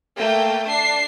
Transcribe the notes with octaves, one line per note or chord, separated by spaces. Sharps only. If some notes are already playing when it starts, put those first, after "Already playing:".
A3 A#3 G5
D4 C7